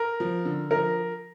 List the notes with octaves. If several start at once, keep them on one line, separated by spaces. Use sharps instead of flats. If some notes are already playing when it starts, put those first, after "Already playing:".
Already playing: A#4
F3
D3
F3 A#4